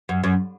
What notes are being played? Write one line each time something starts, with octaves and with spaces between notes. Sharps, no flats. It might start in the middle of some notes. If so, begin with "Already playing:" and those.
F#2
F#2